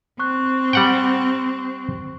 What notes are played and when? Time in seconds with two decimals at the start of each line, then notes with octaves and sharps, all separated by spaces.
0.20 C4 C#6 F#6
0.73 G3 F#5 G5